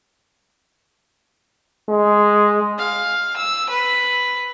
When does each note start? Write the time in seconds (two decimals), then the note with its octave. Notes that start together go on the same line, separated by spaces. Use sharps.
1.89 G#3
2.78 F5
3.36 E6
3.70 B4